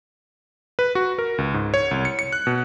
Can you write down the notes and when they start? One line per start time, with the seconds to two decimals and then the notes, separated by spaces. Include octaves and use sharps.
0.79 B4
0.95 F#4
1.19 A#4
1.38 C#2
1.54 G#2
1.74 C#5
1.91 C2
2.05 C#7
2.19 C#7
2.33 F#6
2.47 B2